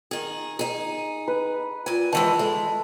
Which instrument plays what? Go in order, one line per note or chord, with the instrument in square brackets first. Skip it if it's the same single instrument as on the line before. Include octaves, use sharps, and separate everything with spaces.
[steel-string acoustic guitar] D#3 G#4
D#4 G#4
[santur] B4
[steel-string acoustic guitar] A#2 G#5
[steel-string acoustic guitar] D#3 E3 G#3 [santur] A5
[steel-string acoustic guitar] G#3 [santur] A3